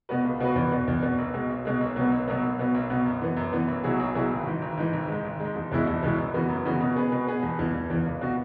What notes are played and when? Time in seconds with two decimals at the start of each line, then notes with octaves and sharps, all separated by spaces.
0.09 B2 B3 F#4 B4
0.24 C#2
0.40 B2 B3 F#4 B4
0.56 E2
0.72 B2 B3
0.88 E2
1.03 B2 B3
1.18 B1
1.34 B2 G#3
1.49 B1
1.65 B2 G#3
1.81 B1
1.96 B2 F#3 B3
2.12 B1
2.28 B2 F#3 B3
2.43 B1
2.59 B2 B3
2.74 B1
2.90 B2 B3
3.06 F#2
3.21 E3 B3
3.37 F#2
3.53 E3 B3
3.68 B1
3.84 B2 F#3 E4 G#4
3.99 B1
4.15 B2 F#3 E4 G#4
4.31 G#1
4.46 G#2 E3
4.62 G#1
4.77 G#2 E3
4.93 G#1
5.08 G#2 G#3
5.25 G#1
5.40 G#2 G#3
5.56 E1
5.72 E2 B2 G#3 E4
5.87 E1
6.03 E2 B2 G#3 E4
6.18 F#2
6.34 C#3 E3 B3 F#4
6.49 F#2
6.65 C#3 E3 B3 F#4
6.81 B2
6.96 B3 G#4 B4
7.12 B2
7.27 B3 G#4 B4
7.43 E1
7.59 E2 E3
7.74 E1
7.90 E2 E3
8.06 C#2
8.21 B2 B3 F#4